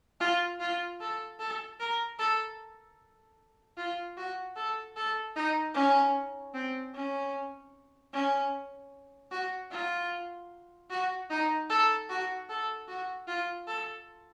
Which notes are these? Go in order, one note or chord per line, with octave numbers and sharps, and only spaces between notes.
F4
F4
A4
A4
A#4
A4
F4
F#4
A4
A4
D#4
C#4
C4
C#4
C#4
F#4
F4
F#4
D#4
A4
F#4
A4
F#4
F4
A4